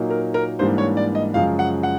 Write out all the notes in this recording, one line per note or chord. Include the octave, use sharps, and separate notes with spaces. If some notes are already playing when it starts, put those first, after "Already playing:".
Already playing: A#2 F#3 A#3 D#4
A#4
A#4
G#2 E3 G3 A#3 D4 C5
C#5
D5
D#5
F#2 C#3 F3 G#3 F5
F#5
F#5